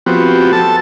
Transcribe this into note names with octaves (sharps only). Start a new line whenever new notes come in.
F3 B3 C4 F#4 G4
A4 A5